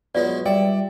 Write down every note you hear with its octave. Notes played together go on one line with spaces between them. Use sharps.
B2 F#3 G#3 F4 D5
G3 D5 E5 G5